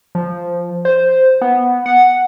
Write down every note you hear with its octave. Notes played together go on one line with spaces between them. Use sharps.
F3
C5
B3
F#5